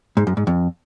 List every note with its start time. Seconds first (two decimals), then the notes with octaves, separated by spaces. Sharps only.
0.17 G#2
0.27 F#2
0.37 G#2
0.47 F2